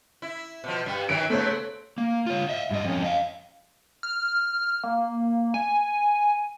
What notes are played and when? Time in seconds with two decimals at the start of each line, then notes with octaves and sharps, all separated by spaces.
0.22 E4
0.64 B2 F3
0.86 G2 G3
1.09 D#3 E3 F#3 D7
1.30 C#3 F#3 A3 B3 C5 C#5
1.98 A#3
2.26 F4 C#5
2.49 D#5 E5
2.71 G2 D#5
2.85 F2 C#4
3.04 D#5 F5
4.03 F6
4.84 A#3
5.54 G#5